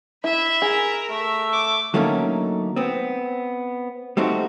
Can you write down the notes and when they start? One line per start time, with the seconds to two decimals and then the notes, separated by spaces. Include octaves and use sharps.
0.24 E4 E5 B5
0.62 G#4 A#4
1.10 A3 E5
1.52 D6
1.94 D3 F#3 A3 A#3 C#4 D#4
2.76 B3 C4
4.17 G3 A3 C4 D#4 F#4